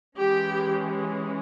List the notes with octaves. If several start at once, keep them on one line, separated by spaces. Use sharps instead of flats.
E3 G#3 C#4 G4